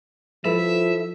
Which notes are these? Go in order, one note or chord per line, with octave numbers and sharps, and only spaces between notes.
F3 E4 A4 B4 E5